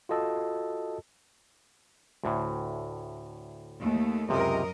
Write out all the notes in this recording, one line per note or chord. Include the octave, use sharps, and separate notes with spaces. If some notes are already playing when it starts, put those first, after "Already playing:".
F4 F#4 A4 D#5 A5 E6
D2 A2
D#2 A3
C#2 F#2 C3 A#4 D#5